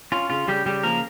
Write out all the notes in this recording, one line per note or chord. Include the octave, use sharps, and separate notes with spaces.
C#4 F4
C#3 F4
C#3 G3 G4
C#3 G3 G4
F3 A#3 A#4